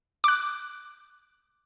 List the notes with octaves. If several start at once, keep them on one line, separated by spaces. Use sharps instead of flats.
D6 F#6